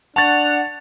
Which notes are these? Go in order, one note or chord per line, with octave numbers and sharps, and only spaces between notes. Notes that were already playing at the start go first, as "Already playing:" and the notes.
D4 F#5 A5 C#6 A6 F7